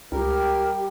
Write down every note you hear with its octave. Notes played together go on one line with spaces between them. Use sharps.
C#2 G3 G4 A#4